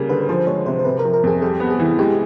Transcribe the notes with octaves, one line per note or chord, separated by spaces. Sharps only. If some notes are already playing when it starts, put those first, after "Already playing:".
Already playing: C#3 G3 A#3
D3 B4
B4
F3 C5
G#3 C#5
C3 C5
C5
C3 B4
A#4
F3
A#4
F2 G#4
G3 A4
B3
G#4
E3
G#3 G4